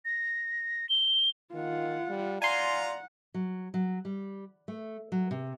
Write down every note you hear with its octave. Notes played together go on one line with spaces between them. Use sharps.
A#6
G7
D#3 F4 F#5
G3
F4 D5 F#5 G#5 A#5 C6
F#3
F#3
G3
A3
F#3
C3